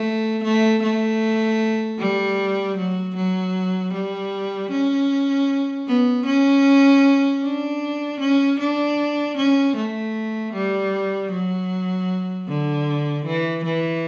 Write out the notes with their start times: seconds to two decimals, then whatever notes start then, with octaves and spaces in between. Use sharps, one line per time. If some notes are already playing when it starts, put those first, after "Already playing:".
Already playing: A3
0.44 A3
0.83 A3
1.99 G3
2.77 F#3
3.16 F#3
3.93 G3
4.71 C#4
5.87 B3
6.26 C#4
7.43 D4
8.20 C#4
8.60 D4
9.37 C#4
9.76 A3
10.54 G3
11.31 F#3
12.48 D3
13.26 E3
13.64 E3